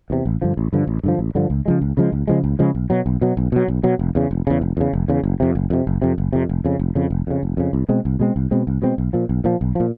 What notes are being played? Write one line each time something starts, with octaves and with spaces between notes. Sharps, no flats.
E2 C3
A1
G2 D3 F3
A1
G2 D3 F3
A1
G2 D3 F3
A1
G2 D3 F3
C#2
C#3 F3 G#3
C#2
C#3 F3 G#3
C#2
C#3 F3 G#3
C#2
C#3 F3 G#3
B1
B2 F#3
B1
B2 F#3
B1
B2 F#3
B1
B2 F#3
F1
E2 C#3
F1
E2 C#3
F1
E2 C#3
F1
E2 C#3
F#1
F2 C3
F#1
F2 C3
F#1
F2 C3
F#1
F2 C3
F1
F2 C#3
F1
F2 C#3
F1
F2 C#3
F1
F2 C#3
C2
B2 G#3 C4
C2
B2 G#3 C4
C2
B2 G#3 C4
C2
B2 G#3 C4
B1
A#2 F3
B1
A#2 F3
B1
A#2 F3